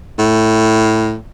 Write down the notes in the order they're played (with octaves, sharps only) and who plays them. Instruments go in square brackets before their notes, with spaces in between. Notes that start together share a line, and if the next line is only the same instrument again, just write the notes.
[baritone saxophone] A2